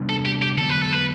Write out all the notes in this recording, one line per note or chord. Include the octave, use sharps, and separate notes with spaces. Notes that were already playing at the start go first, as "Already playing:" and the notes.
Already playing: C3 G3 B3 D4
A4
G4
G4
D3 F#3 B3 A4
B4
A4
B4